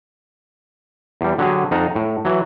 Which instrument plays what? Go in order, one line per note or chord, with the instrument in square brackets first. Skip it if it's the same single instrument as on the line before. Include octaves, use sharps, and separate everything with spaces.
[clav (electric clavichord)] E2 G3
D3 F#3 G4 G#4
F2 D#4 F5 F#5 A5 A#5
A2
E3 F#3